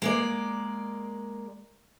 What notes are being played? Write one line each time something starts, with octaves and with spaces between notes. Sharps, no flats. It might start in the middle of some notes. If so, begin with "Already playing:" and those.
G#3 A#3 D5